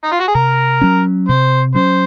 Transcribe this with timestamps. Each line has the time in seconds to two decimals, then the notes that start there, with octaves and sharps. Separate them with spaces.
0.04 D#4
0.12 F4
0.20 F#4
0.28 G#4
0.35 C3 A#4
0.81 F#3 C#4
1.29 C3 C5
1.75 F#3 C#4 C5